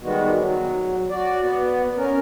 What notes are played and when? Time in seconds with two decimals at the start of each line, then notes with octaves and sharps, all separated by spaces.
0.01 D#3 G3 G#3 B3 F#4
0.36 F#3
1.11 F#4 D5
1.42 B3
1.97 C#4 A#4